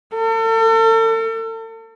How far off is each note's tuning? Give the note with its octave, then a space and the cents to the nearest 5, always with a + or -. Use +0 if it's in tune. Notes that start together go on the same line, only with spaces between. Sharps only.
A4 +40